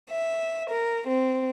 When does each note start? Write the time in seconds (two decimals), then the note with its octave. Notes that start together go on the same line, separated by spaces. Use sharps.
0.10 E5
0.70 A#4
1.08 C4